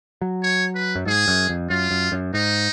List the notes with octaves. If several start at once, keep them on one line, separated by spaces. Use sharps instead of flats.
F#3
C#5
B4
F#2
G#2 G#4
F#2
F2
F#2 F4
F#2
F#2
G#2 D#4